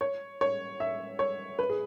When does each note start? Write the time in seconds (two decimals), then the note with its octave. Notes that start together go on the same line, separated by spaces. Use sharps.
0.01 C#5
0.41 C#5
0.80 E5
1.19 C#5
1.59 B4
1.70 G#4